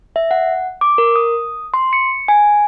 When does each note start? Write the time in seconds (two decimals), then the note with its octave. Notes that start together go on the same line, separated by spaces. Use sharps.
0.16 E5
0.31 F#5
0.81 D6
0.98 A#4
1.16 D#6
1.74 C6
1.93 C#7
2.28 G#5